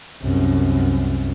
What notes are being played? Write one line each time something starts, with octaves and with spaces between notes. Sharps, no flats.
C2 F#2